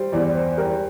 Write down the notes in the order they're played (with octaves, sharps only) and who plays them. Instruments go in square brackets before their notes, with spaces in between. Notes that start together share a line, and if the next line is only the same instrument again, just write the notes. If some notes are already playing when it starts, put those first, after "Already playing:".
Already playing: [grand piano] G3 [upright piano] C5
[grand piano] E2 [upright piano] D5
[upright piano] C5
[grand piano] G3 [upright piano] A#4